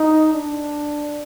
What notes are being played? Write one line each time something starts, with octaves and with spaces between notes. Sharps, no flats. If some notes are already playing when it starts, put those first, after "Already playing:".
Already playing: D#4
D4